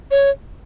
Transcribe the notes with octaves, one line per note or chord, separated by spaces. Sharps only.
C#5